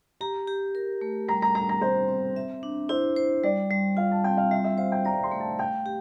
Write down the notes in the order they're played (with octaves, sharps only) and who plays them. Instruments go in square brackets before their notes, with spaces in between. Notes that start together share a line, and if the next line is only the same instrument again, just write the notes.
[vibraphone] G4 [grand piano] A#5
[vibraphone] G4
A#4
A3
[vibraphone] G3 [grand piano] A#5
[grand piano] A#5
[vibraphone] G3 [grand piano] A#5
[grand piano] A#5
[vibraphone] C4 [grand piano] C5
[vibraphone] C4
E5
D4
[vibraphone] E4 [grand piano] C5
[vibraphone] C5
[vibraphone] G3 [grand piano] D5
[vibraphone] G3
[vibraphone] F4 [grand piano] F5
[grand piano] A5
[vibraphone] C4 [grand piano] G5
[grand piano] F5
[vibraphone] G3 [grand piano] E5
[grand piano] E5
[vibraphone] C5 [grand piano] F5
[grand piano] G5
[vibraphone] D5 [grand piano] A#5
[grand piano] C6
[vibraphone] A3
[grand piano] A5
[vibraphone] F5 [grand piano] G5
[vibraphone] G4